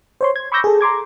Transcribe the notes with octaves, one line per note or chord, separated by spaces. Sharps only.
C5 C#5 C6
G#6
B5 C#6 D6 E6 G6 A#6
G#4 A4
A#5 C6 D6 G#6